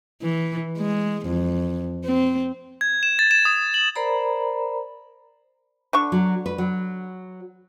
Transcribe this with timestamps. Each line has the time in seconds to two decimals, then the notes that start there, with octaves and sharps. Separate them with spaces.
0.22 E3
0.78 G#3
1.26 F2
2.04 C4
2.81 G#6
3.03 E7
3.19 A6
3.31 E7
3.45 D#6
3.74 F#7
3.95 A#4 C5 D5 A#5 B5
5.93 D3 D4 C#6
6.12 F#3
6.46 B4
6.58 F#3